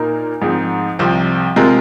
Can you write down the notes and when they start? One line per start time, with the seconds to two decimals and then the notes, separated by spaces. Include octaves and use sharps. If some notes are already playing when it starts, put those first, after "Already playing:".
Already playing: A#2 A#3 D#4 A#4
0.42 G#2 F3 C4 D#4 G#4
0.99 C2 C3 F3 C4
1.56 C3 G#3 C4 F4 A#4